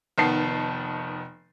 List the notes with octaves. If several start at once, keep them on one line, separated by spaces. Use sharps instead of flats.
F1 D#3 B3 A5 C7